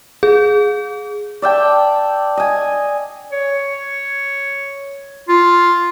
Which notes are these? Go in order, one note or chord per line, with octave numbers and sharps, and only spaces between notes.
G#4
D5 E5 G5 A5
D#5 G#5
C#5
F4